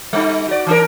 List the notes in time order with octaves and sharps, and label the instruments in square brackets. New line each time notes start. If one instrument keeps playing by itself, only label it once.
[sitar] G3 D#4
F#4 D5
E3 C#4 A#4